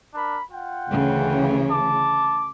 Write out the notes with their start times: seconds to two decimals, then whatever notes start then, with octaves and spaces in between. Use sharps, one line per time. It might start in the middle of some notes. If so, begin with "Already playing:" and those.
0.14 D4 A#4 B5
0.51 F4 F#5 G5
0.89 D2 C#3 E3
1.71 A5 D6